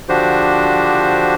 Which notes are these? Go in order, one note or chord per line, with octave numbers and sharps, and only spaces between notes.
D3 F3 D4 F#4 G4 C5